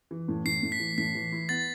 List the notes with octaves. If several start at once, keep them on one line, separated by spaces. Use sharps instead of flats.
E3
A2
A2 C7
A2
B6
E3
A2 B6
E3
E4
B3 A6